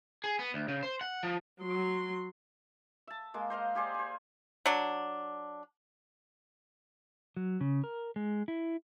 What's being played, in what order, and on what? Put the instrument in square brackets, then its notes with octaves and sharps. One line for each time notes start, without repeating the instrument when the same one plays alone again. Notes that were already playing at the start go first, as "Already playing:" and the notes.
[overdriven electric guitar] G#4
B3
D2
C#3
C5
F#5
F3
[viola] F#3 C6
[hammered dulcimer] E5 A5
G#3 A#3
C5 D#5 F5 A#5
G4 G#4 C5 D5
C5 G#5
[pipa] F#3 D4
[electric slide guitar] F#3
C#3
A#4
G#3
E4